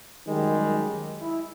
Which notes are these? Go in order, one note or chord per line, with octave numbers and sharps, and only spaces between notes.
F#2 D#3 G3 G#3
E4